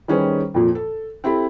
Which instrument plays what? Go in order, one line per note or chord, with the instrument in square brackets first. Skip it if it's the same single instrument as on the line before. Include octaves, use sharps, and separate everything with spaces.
[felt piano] D#3 G3 C#4 G#4 B4 C5
F2 A#2 F3
A4
C4 E4 G4 A4 B5